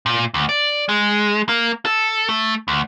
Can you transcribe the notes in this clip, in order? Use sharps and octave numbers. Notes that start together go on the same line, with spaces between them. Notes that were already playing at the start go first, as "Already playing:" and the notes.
A#2
D2
D5
G#3
A#3
A4
A3
D2